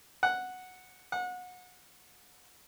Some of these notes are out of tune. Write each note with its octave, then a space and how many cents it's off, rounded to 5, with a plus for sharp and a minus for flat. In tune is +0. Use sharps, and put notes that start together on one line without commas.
F#5 -5
F#5 -30